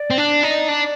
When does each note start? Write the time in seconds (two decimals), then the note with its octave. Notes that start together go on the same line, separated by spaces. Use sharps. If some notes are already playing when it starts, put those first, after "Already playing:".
Already playing: D5
0.10 C4
0.18 D4
0.43 D#4
0.68 D4